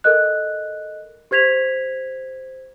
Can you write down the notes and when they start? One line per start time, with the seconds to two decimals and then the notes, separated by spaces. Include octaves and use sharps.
0.04 A4 A#4 D#5 F#6
1.31 G4 C5 G#6 B6 F7